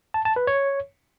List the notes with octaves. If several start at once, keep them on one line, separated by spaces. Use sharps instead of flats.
A5
A5
B4
C#5